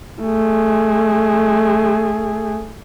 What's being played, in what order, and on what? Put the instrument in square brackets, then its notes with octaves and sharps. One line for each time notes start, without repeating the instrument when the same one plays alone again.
[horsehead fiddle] A3 G#4